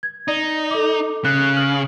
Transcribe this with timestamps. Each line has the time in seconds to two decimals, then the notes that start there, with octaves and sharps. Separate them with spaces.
0.03 G#6
0.28 D#4 D5
0.71 A4 D6
1.25 C#3 F#6
1.57 F6 F#7